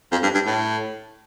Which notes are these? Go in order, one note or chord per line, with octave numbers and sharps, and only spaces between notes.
F2
G2
G2
A2